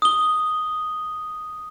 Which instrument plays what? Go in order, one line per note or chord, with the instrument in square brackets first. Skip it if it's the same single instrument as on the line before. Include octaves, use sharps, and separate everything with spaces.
[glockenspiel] D#6 G7